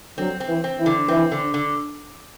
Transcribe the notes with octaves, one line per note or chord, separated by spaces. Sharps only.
D3 F#3 C4
C4
E3
C4
E3
D3
E3 C4
D3
D3